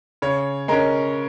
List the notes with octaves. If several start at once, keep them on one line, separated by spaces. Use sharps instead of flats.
C#3 C#5
G#3 C#4 A#4